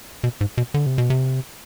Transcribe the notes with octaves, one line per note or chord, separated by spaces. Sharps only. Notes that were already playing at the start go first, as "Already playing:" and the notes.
B2
G#2
B2
D3
C3
B2
C3